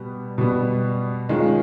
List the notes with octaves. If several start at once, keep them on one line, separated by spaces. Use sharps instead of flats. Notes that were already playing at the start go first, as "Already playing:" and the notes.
Already playing: B2 G3 B3
B2 G3 B3
D#3 G#3 C#4 F4